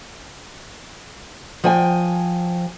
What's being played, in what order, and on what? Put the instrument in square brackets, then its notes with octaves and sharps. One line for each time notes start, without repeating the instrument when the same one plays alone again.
[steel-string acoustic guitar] F3 G5 G#5